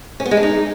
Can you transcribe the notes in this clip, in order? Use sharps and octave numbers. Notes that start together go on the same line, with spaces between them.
C#4
B3
G#3
D4
D#4